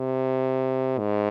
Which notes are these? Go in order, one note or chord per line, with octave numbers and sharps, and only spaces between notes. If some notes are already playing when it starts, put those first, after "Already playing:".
Already playing: C3
G#2